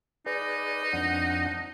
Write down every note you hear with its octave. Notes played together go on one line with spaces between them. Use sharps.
D#4 G#4 B4 D5
F2 D4 F#5